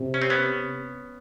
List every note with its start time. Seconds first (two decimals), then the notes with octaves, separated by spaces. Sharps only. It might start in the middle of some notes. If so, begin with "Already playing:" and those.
Already playing: C3
0.14 C#4
0.22 C4
0.30 B3 C#4